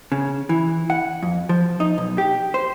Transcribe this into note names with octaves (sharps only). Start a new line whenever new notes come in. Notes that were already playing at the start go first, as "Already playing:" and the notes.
C#3
E3
F#5
F2
F3
D#4
B1
G4
C5